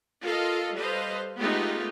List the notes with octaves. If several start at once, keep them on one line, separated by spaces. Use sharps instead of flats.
F4 A4 A#4 D#5 F5
G3 A4 B4 C5 D#5 F5
G#3 A3 B3 D#4 F4 G4